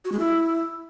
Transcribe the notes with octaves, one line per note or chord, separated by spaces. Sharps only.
F#4
G#3
E4